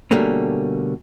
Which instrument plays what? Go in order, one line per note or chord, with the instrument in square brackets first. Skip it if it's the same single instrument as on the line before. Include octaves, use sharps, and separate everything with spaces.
[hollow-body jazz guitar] B2 D3 G3 A3 A#3 C#4